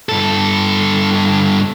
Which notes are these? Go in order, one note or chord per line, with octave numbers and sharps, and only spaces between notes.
G2 A4